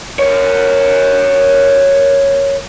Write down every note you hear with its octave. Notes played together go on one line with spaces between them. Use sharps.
A#4 C#5